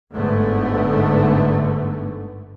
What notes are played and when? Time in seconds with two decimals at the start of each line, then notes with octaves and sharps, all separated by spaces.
0.14 G1 G#2 D3 A3 B3